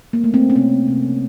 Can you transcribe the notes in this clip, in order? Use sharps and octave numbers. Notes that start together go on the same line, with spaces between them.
A#3
A3
C4
C#4
C3 C4
C3